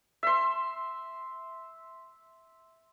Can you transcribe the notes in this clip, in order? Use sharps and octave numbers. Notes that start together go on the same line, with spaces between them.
E5 C6